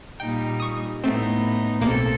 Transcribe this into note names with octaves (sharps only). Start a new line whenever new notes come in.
A#2 G3 D#4 G5
C#6 D#6
A2 A3 B3 C4 D#4
B1 A#3 C4 A4